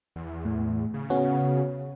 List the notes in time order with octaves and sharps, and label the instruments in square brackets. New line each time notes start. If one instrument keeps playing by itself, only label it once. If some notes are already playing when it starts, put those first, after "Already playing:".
[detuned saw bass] E2
[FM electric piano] A2
[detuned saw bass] C#3
[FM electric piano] B3 C#4 F#4